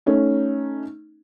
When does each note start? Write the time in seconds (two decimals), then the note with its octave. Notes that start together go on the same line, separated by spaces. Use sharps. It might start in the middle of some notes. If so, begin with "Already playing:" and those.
0.06 A3 C#4 D#4